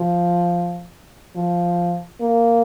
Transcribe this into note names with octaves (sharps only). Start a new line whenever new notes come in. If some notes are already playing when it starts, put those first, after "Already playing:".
Already playing: F3
F3
A#3